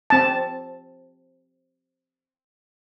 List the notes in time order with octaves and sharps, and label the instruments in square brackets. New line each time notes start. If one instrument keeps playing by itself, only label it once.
[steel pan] C4 A5